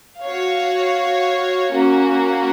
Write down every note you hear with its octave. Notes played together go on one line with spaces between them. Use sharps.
F#4 C#5 F5
A#3 C#4 F#4